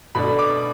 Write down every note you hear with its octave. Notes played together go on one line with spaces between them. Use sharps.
B2 A3 D4 B5
D6